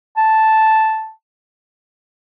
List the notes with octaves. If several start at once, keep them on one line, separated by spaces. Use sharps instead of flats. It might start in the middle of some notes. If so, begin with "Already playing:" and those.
A5